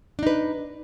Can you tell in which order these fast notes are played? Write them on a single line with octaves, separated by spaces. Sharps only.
D4 D#4 B4